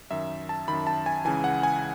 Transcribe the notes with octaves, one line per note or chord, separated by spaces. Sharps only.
F#2 D#3 E5
A5
F#2 D#3 B5
A5
G#5
C#2 C#3 E3 G#5
F#5
G#5